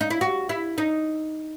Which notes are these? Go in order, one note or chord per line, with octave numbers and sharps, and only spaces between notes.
D#4
E4
F#4
E4
D#4